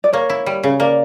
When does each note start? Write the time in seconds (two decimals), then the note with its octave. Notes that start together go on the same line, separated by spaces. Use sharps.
0.04 D5
0.13 A#3 C#5
0.30 E4
0.46 G3
0.63 C#3
0.80 A#3 D5